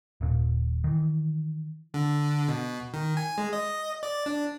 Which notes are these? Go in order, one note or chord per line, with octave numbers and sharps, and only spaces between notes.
D#1 A#2
D#3 E3
D3
B2
D#3
G#5
G#3
D#5
D5
D4